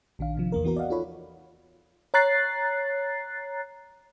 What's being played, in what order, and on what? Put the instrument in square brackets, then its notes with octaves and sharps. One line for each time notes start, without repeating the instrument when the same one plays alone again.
[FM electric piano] A#1 D#3 D4 F5
C3 F3
E2 A#3 A#4
E3 B3 F#4 A#4
D5 D#5 F5 F#5
D#4 F4 A4 C#5 B5
C#5 A#5 F#6 A6 C7